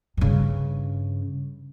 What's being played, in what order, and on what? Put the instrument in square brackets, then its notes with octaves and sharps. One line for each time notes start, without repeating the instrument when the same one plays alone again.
[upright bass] G2 C#3